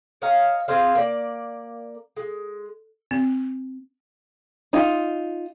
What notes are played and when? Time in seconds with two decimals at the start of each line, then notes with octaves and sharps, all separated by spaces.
0.22 C#5 D#5 F5 A#5
0.68 C4 G#4 C5 F5
0.95 A#3 D5
2.17 G#3
3.11 C4
4.73 D#4 F4